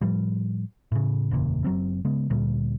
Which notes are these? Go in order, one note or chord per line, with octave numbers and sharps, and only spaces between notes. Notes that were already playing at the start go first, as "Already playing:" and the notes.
A2 F3 G3
A2 C#3
F#1 E2 A#2 C#3
F#1 F#3 C4
C#3 G#3 B3
D2 A#2 G3